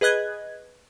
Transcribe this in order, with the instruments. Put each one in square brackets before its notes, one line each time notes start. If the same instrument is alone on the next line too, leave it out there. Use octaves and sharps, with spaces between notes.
[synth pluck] G#4 B4 D#5 F#6 G#6